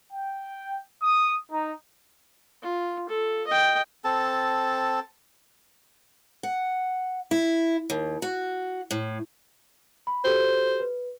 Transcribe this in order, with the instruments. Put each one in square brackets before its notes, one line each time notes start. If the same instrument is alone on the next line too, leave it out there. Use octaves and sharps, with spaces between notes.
[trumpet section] G5
D#6
D#4
[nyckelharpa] F4
A4
D#5 G5
[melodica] C4 A4 A5
[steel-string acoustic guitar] F#5
E4
D#2
F#4
A2
[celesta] B5
[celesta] F#4 G4 A4 [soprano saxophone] C5
[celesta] B4